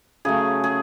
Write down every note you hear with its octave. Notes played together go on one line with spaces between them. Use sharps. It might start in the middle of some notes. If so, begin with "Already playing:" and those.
C#3 F#3 A3 G#4
G#4